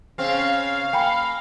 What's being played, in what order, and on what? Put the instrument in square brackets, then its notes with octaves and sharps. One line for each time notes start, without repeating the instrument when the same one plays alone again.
[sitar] C#3 C4 [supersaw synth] F5
[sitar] A#3 [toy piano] G5 G#5 B5